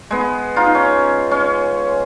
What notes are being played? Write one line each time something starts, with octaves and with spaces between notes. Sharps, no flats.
G#3 B3
D#4 F4
C#4
C#4